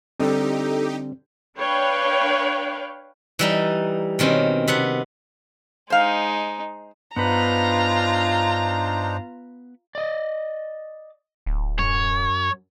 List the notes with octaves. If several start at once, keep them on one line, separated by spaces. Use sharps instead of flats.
D3 G3 C4 D#4 G4 A4
D4 B4 C#5 F5 G5
E3 G3 D#4
B2 D#3 C4 C#4
C3 B3 F#5
G#3 D#4 C5 F5
G2 B3 D4 D#4 F4 B4 C5 A#5
D5 D#5
D1
F#2 C#5